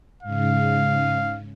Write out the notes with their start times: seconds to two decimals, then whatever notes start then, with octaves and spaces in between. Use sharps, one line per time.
0.23 G#2 C#3 F5